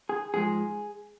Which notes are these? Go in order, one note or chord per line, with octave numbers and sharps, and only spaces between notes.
G#4
G#2 F3 G#3 G#4